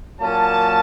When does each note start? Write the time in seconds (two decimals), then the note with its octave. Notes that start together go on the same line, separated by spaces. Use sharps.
0.18 A#2 F#3 A#3 C#4 A5